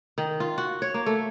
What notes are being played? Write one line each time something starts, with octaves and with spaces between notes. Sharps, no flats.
D#3
F4
F#4
C#5
A#3
A3